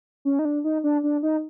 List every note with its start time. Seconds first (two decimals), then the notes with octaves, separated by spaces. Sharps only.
0.25 C#4
0.39 D#4
0.45 D4
0.64 D#4
0.84 D4
1.03 D4
1.23 D#4